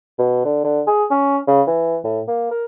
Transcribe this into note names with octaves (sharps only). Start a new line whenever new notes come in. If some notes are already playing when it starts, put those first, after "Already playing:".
B2
D3
D3
G#4
C#4
C#3
E3
A2
A#3
A#4